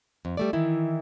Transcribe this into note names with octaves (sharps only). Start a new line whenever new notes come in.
F2
G3 A3 D5
D#3 E3 E4